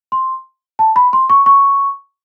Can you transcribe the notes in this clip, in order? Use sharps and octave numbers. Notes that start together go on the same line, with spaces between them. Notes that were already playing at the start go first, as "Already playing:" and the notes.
C6
A5
B5
C6
C#6
C#6